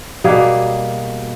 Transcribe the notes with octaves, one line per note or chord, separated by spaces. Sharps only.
B2 G3 A#3 G#4